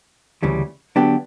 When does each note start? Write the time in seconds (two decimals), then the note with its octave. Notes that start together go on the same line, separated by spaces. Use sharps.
0.43 D2 C#3 E3 G3
0.96 D3 F#3 B3 D4 G4